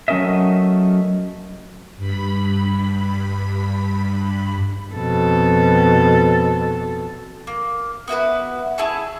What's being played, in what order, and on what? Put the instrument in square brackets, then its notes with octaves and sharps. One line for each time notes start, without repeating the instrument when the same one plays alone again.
[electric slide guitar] F#3 A3 C#4 A#4 D#5 E5
[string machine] G2 B5
[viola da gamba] F2 B2 A4
[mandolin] A#3
B3 E4 F#4 B4
E4 G#4 A5 C#6